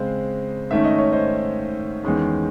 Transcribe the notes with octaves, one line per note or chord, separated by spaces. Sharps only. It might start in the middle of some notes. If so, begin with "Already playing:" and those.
Already playing: C#3 G#3 C4 C5
G#2 D#3 A3 C#4 E5
D#5
C#5
C5 D#5
E2 D#3 G#3 C#4